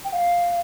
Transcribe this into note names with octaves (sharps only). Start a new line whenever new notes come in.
G5
F5